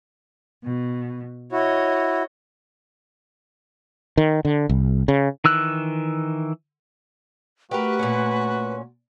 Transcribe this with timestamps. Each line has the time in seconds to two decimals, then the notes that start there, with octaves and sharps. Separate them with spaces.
0.63 B2
1.52 E4 F#4 C#5 D#5
4.17 D#3
4.45 D3
4.69 C2
5.08 C#3
5.44 D#3 E3 E6 F#6
7.71 A3 F#4 G4 A#4 B4
7.99 A#2 C#4